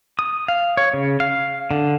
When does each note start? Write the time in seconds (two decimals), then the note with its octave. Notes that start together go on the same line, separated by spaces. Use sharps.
0.19 D#6
0.48 F5
0.77 C#5
0.94 C#3
1.20 F5
1.71 D3